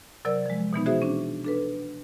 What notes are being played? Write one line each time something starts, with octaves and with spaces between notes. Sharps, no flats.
C3 F#3 A#4 D5 E6 A6
F3 G#3
B2 E3 B3 D#4
F#4 G#4 C5 E5
C#4 D4
D4 A4 B4